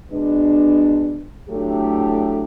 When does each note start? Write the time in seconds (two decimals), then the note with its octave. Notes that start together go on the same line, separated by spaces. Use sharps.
0.12 B2 G#3 B3 D4
1.49 A2 F#3 A3 D4 G4